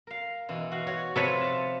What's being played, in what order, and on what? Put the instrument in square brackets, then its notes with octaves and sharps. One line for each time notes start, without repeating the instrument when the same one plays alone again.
[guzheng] A#4 F5
B2 E3 D#4
F#4 F5 F#5
F#4 C#5
[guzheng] C3 F3 [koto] A4 B4 C#5
[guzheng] A5